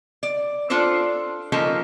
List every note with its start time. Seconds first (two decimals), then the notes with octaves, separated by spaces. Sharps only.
0.23 D5
0.70 D4 F4 A4 C5 D5
1.52 F3 A#3 C#4 D#4 A4